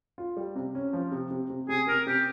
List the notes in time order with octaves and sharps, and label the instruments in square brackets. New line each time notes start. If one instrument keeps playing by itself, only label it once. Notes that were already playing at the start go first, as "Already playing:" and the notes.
[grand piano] F4
G3
C3
C#4
F3
C3
C3
C3
[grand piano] C3 [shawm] G#4
[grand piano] C3 [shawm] A#4
[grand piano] C3 [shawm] G4